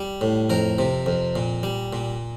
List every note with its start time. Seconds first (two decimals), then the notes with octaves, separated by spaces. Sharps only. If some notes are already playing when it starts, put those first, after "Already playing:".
Already playing: G3
0.21 A2
0.50 F2 A#4
0.79 C3
1.06 F2
1.36 A#2
1.63 G3
1.93 A#2